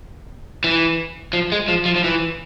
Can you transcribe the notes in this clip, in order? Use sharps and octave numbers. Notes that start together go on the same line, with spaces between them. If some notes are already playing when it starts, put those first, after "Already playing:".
E3
F3
G#3
F3
F3
F3
E3